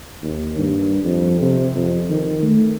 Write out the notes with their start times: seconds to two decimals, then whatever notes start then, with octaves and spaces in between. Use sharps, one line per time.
0.23 D#2
0.58 G2
1.04 F2
1.41 C3
1.75 F2
2.10 D#3
2.42 A3